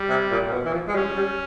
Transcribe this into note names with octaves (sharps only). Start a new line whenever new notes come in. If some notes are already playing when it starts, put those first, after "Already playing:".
Already playing: G3
C3
A#2
A#2
B2
E3
F3
G#3
G3 C#4
G3